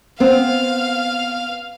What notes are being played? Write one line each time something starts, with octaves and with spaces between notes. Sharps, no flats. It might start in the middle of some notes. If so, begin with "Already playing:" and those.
B3 C4 F5